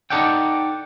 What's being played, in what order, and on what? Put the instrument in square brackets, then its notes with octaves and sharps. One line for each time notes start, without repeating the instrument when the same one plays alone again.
[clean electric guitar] D#4 F4 A4 D5 F#5 G5